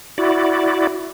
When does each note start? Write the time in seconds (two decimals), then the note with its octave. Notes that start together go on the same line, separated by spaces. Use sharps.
0.18 E4 F#4 D5